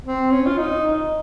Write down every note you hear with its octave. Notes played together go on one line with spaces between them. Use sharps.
C4
C#4
F4
D#4